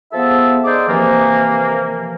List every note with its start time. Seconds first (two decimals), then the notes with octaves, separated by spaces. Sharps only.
0.13 F3 B3 G#4 A4 E5
0.64 D#4 G#4 C5 D5 D6
0.88 C3 E3 F3 A#3